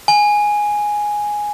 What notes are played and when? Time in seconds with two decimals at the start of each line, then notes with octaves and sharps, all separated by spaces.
0.08 G#5